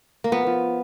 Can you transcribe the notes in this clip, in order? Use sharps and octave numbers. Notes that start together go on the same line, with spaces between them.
A#3
F3 B3
F3